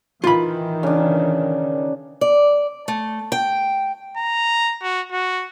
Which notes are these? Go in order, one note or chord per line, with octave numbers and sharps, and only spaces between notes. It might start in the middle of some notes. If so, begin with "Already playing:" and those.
D#3 E3 F4 B5
C#3 D4
D5
A3
G5
A#5
F#4
F#4